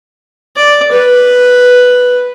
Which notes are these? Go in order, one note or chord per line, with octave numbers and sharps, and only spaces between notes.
D5
B4